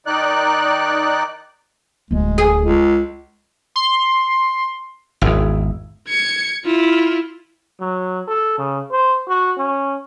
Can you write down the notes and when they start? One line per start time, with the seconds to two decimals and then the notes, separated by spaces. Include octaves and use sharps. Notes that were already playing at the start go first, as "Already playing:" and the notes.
0.06 D#3 D#4 D5 F#6
2.11 D1 D2 G#3
2.38 G#4
2.61 C#2
3.76 C6
5.21 G#1 E2
6.08 G#6 C#7
6.65 E4 F4
7.81 F#3
8.28 A4
8.58 C#3
8.91 C5
9.28 F#4
9.58 C#4